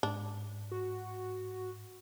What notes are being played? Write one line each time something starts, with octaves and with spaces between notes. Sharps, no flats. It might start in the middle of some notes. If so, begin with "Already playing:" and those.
G#2 D4
F#4